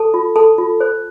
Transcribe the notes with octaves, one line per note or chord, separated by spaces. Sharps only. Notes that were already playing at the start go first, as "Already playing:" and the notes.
Already playing: A4 A5
F4
A4 A5
F4
C5